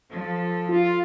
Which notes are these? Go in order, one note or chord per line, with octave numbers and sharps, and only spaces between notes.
F3 A4
F4